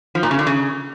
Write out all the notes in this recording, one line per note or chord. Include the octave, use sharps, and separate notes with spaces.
F3
A#2
C#3
D3
C#3